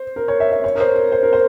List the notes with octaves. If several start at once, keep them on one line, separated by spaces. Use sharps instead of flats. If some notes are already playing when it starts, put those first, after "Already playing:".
Already playing: C5
A#4
C#5
E5
E5
C#5
A#4
C5
A#4
C5
A#4
C5